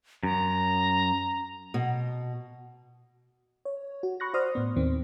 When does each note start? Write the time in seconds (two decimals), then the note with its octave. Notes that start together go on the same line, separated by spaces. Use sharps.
0.23 F#2 A#5
1.74 B2
3.65 C#5
4.03 F#4
4.20 B5 C#6 F#6 A#6
4.34 F#4 C5 D5 C6 D#6 F6
4.55 A2 B3
4.76 D#2 D#3 C4